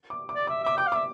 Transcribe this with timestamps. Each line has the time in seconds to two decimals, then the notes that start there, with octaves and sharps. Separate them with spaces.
0.10 D6
0.29 D6
0.35 D5
0.47 E5 D6
0.63 E5 D6
0.77 G5 D6
0.87 F5
0.92 E5 D6